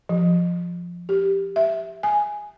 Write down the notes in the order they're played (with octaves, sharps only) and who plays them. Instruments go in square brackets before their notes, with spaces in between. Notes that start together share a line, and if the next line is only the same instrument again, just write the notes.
[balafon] F3
G4
E5
G#5